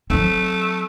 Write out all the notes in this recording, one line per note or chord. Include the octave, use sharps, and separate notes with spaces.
F#3 A3 C4